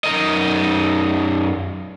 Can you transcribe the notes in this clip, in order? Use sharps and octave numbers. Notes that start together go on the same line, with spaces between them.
F#2 D#4 A#4 D#5